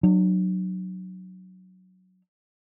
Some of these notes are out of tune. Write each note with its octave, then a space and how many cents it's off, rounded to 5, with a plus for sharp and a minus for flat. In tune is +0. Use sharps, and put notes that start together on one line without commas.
F#3 +0 D4 +45